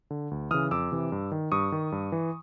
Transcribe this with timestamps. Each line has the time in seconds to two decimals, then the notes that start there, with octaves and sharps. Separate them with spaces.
0.10 D3
0.31 D2
0.51 C#3 E3 D#6 F6
0.71 F2 D6 E6
0.92 C3 E3
1.12 G2
1.32 D#3
1.52 G2 C#6 D#6
1.72 D#3
1.92 G2
2.12 E3